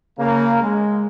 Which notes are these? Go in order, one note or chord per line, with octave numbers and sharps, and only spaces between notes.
C#3 A#3
G#3